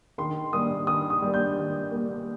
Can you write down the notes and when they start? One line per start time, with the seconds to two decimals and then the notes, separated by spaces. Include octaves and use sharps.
0.18 D#3 C6
0.53 G3 A#3 D#6
0.87 D#3 D#6
1.10 D#6
1.22 G3 A#3
1.34 G6
1.57 D#3
1.91 G3 A#3